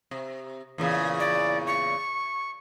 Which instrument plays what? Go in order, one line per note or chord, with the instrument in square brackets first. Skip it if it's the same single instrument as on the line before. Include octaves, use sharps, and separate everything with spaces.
[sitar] C3
E2 A#2 C#3
[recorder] D5
C#6